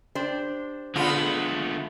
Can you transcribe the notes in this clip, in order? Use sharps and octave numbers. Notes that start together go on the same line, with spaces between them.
D4 G4 C5
D3 G#3 A3 B3 F4